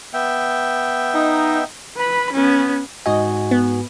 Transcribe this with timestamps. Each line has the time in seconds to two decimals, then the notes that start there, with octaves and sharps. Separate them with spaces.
0.14 B3 E5 G5
1.14 D#4
1.97 B4 B5
2.33 B3 C#4
3.06 G#2 F#4 D#5 G#5
3.51 B3